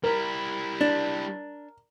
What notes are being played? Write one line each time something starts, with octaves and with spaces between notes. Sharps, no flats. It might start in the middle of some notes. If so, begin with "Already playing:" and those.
G3 E4 A#4
D4